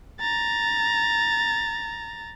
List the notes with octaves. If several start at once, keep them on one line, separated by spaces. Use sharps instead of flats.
A#5 A6